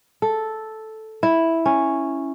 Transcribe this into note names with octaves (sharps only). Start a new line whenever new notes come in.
A4
E4
C#4